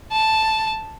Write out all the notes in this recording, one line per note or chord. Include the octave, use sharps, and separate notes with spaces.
A5